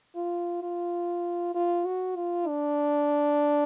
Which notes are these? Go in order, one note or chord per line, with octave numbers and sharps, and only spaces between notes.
F4
F4
F4
F#4
F4
D4